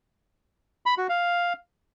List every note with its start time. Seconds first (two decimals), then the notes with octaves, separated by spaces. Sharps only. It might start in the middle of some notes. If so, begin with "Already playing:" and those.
0.86 B5
0.98 F#4
1.09 F5